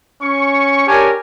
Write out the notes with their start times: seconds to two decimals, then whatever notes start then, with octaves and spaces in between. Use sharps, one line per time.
0.21 C#4 C#6
0.87 D4 G4 A#4 C#5 G#5